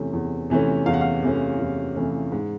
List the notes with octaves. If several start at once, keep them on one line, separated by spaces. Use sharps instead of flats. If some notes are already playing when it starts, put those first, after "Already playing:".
Already playing: E2 C3 E3 A3 C#4
E2
C3 E3 A3 C#4
E2 F5
F#5
F5
C3 E3 A3 C#4
E2
C3 E3 A3 C#4
G#2